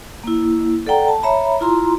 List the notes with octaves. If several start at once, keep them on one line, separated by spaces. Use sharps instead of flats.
A#3 E4
A4 D5 F#5 G5 A#5
A5
C#5 E5 A#5 B5
E4 F4 A#5 C6